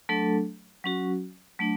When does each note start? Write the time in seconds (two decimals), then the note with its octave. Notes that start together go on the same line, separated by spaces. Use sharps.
0.09 F#3 A3 D4 A4
0.84 F#3 C#4 F#4
1.59 F#3 A3 D4